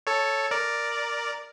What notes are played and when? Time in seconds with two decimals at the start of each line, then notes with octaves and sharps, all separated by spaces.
0.07 A4 C#5
0.51 A#4 D5